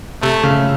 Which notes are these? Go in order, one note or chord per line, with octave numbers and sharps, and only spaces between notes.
C3 A3
C#3